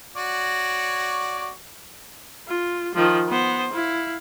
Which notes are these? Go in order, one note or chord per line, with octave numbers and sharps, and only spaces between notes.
F#4 C#5 D5
F4
D#3 F3
B3 C5
E4 F5